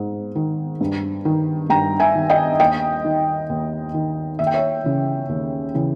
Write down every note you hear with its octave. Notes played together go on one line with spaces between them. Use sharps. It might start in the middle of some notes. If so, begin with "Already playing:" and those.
Already playing: G#2
D#3
G2
D#3
G2 G5 A#5
E5 G#5
D#3
D#5 G5
D#2 D#5 G5
D#3
D#2
D#3
D#2 E5
G5
C#5 E5
C#3 E3
D#2
C#3 E3